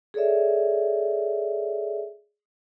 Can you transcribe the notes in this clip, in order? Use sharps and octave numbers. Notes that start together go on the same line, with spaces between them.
G#4 A4 C#5 D5 E5